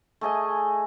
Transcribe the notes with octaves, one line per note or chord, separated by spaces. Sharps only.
A3 G#4 D#5 G#5